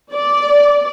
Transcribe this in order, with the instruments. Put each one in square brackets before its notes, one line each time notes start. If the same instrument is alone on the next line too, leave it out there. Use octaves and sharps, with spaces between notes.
[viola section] D5